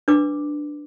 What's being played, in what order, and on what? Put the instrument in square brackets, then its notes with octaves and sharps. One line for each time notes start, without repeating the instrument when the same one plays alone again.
[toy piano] D4 B4 D6